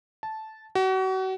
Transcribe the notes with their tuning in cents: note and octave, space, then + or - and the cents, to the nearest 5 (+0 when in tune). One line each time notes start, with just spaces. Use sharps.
A5 -10
F#4 +35